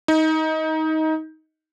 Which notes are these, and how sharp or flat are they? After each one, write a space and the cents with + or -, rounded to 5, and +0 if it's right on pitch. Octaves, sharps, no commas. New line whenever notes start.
D#4 +20